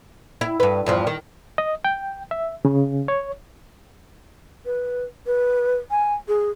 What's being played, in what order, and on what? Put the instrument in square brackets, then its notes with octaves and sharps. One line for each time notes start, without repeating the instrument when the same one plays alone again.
[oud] E4
G2 B4
E2 G2 F3
D#3
[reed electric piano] D#5
G5
E5
C#3
C#5
[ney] B4
B4
G#5
G#4